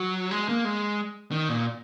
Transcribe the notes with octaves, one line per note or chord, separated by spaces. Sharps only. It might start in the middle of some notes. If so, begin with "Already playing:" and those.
Already playing: F#3
G#3
A#3
G#3
D#3
A#2